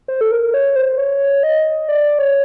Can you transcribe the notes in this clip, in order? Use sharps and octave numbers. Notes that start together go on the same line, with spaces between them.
C5
A4
A#4
C#5
C5
C#5
D#5
D5
C#5